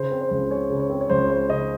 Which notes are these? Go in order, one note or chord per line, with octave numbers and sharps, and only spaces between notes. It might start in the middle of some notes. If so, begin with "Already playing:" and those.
Already playing: C#3 C5
C4
C5
C#2
G#3 C#5
C#3
C#5
C4
C#5
C#2 C5
G#3 C5
C#3 D#5